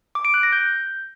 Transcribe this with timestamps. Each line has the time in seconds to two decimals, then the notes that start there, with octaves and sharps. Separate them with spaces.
0.15 D6
0.25 D7
0.34 F#6
0.43 A#6
0.52 G6